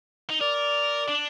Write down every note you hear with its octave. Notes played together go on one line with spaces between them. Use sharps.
D#4
A#4 D5
D4